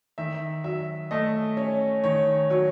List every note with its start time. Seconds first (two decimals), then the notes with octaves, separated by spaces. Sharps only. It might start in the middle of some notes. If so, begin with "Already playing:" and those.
0.18 D#3 E5
0.64 F#3 E5
1.11 A3 D#5
1.57 C#4 C#5
2.04 D#3 C#5
2.50 F#3 C#5